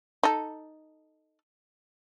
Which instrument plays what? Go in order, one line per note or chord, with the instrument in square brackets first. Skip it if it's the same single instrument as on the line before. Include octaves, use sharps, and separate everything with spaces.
[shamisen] D#4 A4